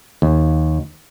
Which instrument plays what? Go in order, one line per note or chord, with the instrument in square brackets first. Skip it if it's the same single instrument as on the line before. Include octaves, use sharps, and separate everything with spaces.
[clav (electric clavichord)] D#2